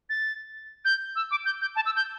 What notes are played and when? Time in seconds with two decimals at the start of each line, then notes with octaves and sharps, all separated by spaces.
0.10 A6
0.85 G6
1.16 E6
1.31 D6
1.45 G6
1.61 G6
1.76 A5
1.86 E6
1.96 G6